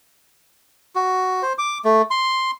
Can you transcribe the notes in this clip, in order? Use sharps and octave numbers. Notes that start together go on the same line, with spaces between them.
F#4
C5
D6
A3
C6